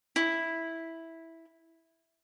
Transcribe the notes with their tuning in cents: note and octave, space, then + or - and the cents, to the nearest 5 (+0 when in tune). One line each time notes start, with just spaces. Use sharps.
E4 -5